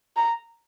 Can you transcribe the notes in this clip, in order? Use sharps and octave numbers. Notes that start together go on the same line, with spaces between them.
A#5